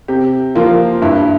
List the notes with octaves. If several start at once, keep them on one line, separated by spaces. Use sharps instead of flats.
C3 G4
F3 A#3 F4
G2 E4